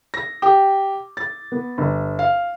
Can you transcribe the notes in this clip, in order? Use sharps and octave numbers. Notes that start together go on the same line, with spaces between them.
A#6
G4
A6
B3
G1
F5